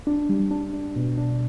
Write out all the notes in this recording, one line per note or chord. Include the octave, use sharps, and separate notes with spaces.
D4
G3
D4
D4
B2
D4